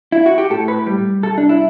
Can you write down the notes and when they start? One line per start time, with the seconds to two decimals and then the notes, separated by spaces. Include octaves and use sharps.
0.12 E4
0.26 F#4
0.38 G4
0.50 A2 A4
0.68 B4
0.87 G3
1.23 C2 A4
1.38 D4
1.49 E4